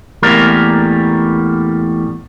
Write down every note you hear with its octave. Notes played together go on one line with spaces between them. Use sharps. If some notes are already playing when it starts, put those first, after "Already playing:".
E2 A2 G3 A#3 A#4